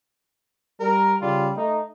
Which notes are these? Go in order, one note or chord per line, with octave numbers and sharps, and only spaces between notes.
G3 A#4
C#3 G3 F4
A3 D#4